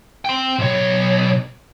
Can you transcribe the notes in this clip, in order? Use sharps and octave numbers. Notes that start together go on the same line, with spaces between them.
G5 C6
B1 C#5